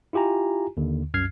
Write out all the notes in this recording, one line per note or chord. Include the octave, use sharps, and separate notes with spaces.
E4 F4 G4 G#5 A#5
D#2 D3
C2 F#2 F6 G#6 C7